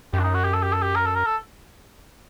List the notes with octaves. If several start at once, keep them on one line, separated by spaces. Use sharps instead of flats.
F#2 G4
D4
D#4
F#4
G4
A4
G4
A4
G4
A#4
A4
A#4
A4